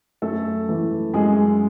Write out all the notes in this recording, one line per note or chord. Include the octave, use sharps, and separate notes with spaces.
F#2 A3 A4
E3 A3
F#2 G#3 G#4